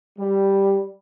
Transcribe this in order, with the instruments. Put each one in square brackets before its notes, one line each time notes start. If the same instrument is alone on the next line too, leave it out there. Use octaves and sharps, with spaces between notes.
[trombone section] G3